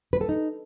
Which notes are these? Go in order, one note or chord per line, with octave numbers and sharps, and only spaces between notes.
B4
A4
D#4